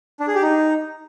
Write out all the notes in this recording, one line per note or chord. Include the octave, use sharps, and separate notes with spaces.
D4
G#4
G4
D#4